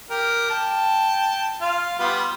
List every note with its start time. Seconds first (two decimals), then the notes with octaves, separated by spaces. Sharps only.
0.10 G4 A#4
0.50 G5 A5
1.61 F4 F5
1.99 G3 B3 F4